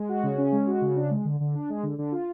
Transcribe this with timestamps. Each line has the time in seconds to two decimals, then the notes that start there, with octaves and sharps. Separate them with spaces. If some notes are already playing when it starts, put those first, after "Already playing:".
Already playing: G#3
0.09 F#4
0.23 C#3
0.38 C#4
0.52 G#3
0.67 F#4
0.82 C#3
0.96 D4
1.11 G#3
1.25 D3
1.40 D3
1.54 D4
1.69 G#3
1.83 D3
1.98 D3
2.12 F4